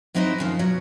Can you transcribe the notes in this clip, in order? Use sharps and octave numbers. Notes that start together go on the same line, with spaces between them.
F#3 B3 C4 D#4 E4 F#4
F#2 D#3 F3
B2 F#3